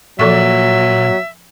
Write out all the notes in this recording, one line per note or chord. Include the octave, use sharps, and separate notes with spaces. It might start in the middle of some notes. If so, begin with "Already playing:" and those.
A#2 F3 F#3 A4 E5 C#6